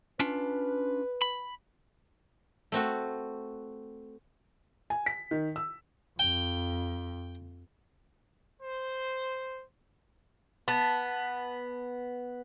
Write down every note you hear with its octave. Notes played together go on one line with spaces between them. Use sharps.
C#4 D4 F4 B4
B5
A3 C4 F#4
G#5
B6
D#3
E6
F2 G5
C5
B3 A5